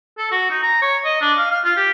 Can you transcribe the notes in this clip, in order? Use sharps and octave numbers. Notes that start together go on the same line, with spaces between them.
A4
F#4
D#4
A#5
C#5
D#5
D4
F5
F5
F4
G4